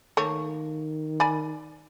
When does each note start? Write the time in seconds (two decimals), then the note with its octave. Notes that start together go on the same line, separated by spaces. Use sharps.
0.17 D#3 A3 A#3 C#5
1.20 D5 G#5 B5